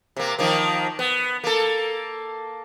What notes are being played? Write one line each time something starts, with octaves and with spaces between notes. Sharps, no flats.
C3 A#3
D#3 F3 A#3
B3
A#3 A4